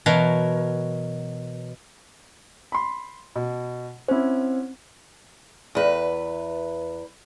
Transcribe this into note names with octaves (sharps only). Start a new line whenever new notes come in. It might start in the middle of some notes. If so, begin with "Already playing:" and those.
B2 E3 F#3 A#4
B5 C6
B2
C4 C#4 E4 C5
E2 B4